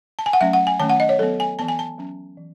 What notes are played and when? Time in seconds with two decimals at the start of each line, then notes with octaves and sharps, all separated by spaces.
0.19 A5
0.26 G#5
0.33 F#5
0.41 F#3 A3 C#4 E5
0.53 F#5
0.67 G#5
0.80 D#3 A3 C#4 A5
0.89 F#5
1.00 D#5
1.09 C#5
1.19 F#3 B3 A4
1.40 G#5
1.59 E3 B3 A5
1.68 G#5
1.79 A5
1.98 F#3 C#4
2.38 E3